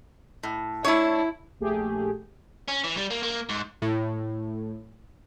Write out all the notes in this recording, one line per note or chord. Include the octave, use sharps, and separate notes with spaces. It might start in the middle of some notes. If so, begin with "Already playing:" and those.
A2
A3 D4 E4 C#5
A#1 A3 G4 G#4
C#4
E3
G3
A#3
A#3
G#2
A2